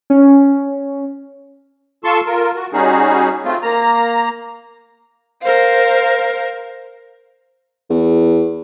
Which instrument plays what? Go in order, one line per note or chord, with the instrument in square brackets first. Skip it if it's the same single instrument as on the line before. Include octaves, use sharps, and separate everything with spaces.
[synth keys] C#4
[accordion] F4 A4 A5 C6 C#6
F4 A#4
F#4
G3 C#4 D#4 F#4 G#4
A3 C4 F4
A#3 A#5
[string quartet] A#4 C5 F5
[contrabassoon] E2